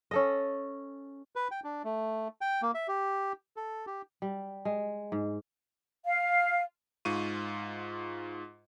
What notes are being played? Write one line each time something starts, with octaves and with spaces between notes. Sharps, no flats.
C#4 A4 D#5
B4
G5
D4
A3
G5
A#3
E5
G4
A4
G4
G3
G#3
G#2
F5
G#2 F4 C#6 D#7